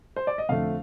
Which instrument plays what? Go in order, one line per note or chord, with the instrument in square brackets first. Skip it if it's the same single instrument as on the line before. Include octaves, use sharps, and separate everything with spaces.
[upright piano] C5
D5
D#5
[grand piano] F2 D3 A3 [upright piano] F5